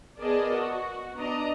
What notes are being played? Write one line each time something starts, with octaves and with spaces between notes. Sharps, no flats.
B3 G#4 A#4 D5 D#5 A5
F#4
B3 D4 D5 D#5 A#5